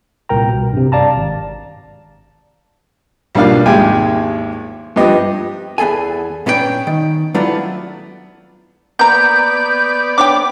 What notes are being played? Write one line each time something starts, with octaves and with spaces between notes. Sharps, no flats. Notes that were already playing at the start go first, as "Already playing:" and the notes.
C2 A#2 A#4 G5 A#5
B2
G2 C3
D5 F5 A5 A#5
G#1
B1 G3 A#3 D4 F4 F5
G#1 D#2 G#3 G4 G5 G#5
G2 F3 B3 G4 D#5
E2 B3 G#4 A4 G#5
A#2 B3 C#4 D4 A#4 G5
D#3
F#3 A3 B3 D4 E4 F4
A#3 B3 D5 A#5 G6
D4 C#5 G5 D6